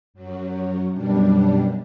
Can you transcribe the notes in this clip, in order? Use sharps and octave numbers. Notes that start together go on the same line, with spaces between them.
F#2 F#3
F#2 B2 G3 D4